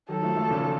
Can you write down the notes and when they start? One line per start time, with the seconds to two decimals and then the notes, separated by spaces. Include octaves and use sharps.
0.09 D#3 F#3 A4
0.23 F3 A3
0.37 F3 A3
0.51 A#2 C#3